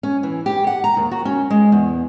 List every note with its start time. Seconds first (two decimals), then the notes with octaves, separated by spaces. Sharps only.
0.03 C#4
0.23 E3
0.46 G4
0.67 F#5
0.84 A#5
0.97 D#2
1.11 F#4
1.25 C#4
1.50 G#3
1.72 E2